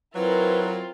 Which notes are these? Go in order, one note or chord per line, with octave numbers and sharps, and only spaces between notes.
F#3 C4 E4 F4 A#4 B4